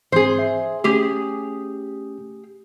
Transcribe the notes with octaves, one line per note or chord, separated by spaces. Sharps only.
G#2 E3 C4 G#4 C5
E5
A3 C#4 G4 G#4